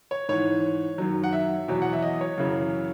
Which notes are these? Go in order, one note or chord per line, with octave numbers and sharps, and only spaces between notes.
C#5
G#2 E3 C#5
F#2 D#3 F#3
F#5
E5
E2 B2 F#3
F#5
E5
D#5
C#5
F#2 C#3 E3